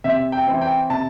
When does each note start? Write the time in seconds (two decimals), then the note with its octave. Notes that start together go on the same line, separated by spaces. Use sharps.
0.04 C3 E5
0.32 G5
0.47 E3 C4 E4
0.61 G5
0.90 C3 A5